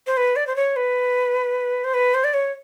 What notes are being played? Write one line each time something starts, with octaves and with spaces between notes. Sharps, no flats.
C5
B4
D5
C5
C#5
B4
C5
B4
C5
D5
C#5